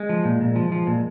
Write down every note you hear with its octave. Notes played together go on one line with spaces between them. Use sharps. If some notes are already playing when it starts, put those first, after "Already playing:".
Already playing: G#3
F3
A#2
A#2
F3
F3
A#2